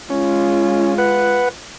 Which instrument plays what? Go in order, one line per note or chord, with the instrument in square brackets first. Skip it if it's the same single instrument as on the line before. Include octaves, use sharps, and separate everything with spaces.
[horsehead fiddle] G#3 F4 [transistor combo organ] C#4
[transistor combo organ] B4 F#5